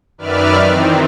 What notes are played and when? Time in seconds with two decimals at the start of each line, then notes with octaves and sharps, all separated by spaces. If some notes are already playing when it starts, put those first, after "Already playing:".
0.18 F#2 D#3 B4 D5 E5 F6
0.66 D#3 E3 C4